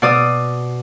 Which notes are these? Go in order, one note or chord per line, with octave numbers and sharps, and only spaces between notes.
B2 D5 D#6